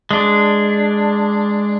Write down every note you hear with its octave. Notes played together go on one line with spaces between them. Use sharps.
G#3 D4